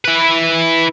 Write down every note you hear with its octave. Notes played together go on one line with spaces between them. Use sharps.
E4 B4